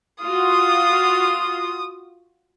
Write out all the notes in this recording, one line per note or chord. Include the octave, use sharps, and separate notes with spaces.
F4 F#4 D#6